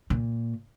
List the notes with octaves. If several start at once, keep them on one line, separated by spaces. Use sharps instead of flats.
A#2